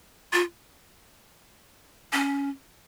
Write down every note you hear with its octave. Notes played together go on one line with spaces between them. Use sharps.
F4
C#4